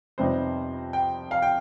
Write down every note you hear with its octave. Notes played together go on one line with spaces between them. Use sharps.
F2 C3 G3 B3 D#4 C5
G5
F5
G5